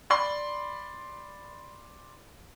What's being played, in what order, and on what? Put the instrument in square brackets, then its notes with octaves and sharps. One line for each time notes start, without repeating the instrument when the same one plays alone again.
[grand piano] D5 B5 C6